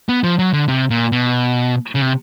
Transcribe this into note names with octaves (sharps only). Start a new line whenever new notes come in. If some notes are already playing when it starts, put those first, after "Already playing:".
B3
F3
F#3
D3
C3
A#2
B2
C#3
C3